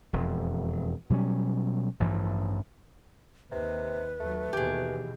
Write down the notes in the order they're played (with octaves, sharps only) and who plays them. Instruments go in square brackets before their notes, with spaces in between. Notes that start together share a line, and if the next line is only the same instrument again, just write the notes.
[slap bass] E1 F2
B2 F#3 G3 C#4
A1 G2 E3 F3
[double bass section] D#2 [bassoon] C3 [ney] B4
[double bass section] D#2 F#3 [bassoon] A3
[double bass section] D#2 B2 E3 [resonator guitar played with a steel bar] G4 G#4